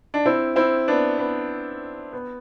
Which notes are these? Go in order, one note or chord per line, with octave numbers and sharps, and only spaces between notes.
D4
C4 E4
C4 E4
B3 D4
B3
B3